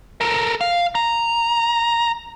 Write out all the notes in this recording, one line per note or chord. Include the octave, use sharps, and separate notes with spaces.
A4 A#4
F5
A#5